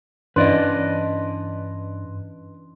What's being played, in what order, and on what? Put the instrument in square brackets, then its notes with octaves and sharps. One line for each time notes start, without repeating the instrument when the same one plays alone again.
[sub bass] G2 [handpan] E3 C#4 D4 [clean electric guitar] B4 D5 D#5 [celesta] C6